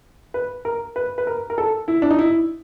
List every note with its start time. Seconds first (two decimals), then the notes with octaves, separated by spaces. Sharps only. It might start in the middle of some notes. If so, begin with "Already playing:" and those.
0.34 B4
0.65 A#4
0.96 B4
1.18 B4
1.27 A#4
1.50 A#4
1.58 A4
1.88 E4
2.02 D4
2.11 D#4
2.19 E4